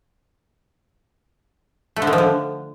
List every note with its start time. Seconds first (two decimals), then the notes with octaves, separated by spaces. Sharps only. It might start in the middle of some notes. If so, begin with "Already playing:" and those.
1.96 A3
2.02 D3
2.07 D#3
2.13 F3
2.18 D3